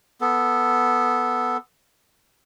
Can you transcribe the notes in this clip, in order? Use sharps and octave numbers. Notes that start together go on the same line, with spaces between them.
B3 A4